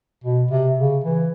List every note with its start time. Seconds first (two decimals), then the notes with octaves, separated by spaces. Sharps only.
0.24 B2
0.51 C3
0.78 C#3
1.04 E3